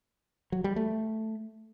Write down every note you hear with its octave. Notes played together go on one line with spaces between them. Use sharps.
F#3
G3
A3